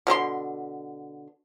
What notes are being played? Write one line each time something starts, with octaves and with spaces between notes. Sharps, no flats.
B2 D3 D#4 C6